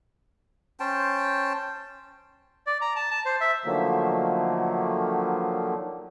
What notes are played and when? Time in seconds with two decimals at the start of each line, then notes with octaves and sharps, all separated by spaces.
0.80 C#4 C5 G5 A5
2.67 D5
2.81 A#5
2.96 A5
3.11 A5
3.25 C5
3.41 E5
3.65 D3 D#3 F3 F#3 A3 A#3